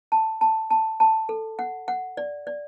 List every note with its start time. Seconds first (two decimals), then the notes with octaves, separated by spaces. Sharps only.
0.12 A5
0.41 A5
0.70 A5
1.00 A5
1.29 A4
1.59 F#5
1.88 F#5
2.17 D5
2.47 D5